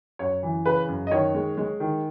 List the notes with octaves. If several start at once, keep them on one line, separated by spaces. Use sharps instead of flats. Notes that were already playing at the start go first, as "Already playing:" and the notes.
F#2 C#5
E3
C#3 B4
F#2
D#5
D#3 C#5
G#3
G#3
D#3